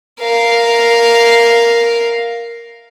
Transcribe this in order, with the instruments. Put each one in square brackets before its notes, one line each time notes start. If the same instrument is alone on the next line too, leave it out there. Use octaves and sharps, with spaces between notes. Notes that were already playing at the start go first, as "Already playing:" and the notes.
[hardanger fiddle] A#4 F5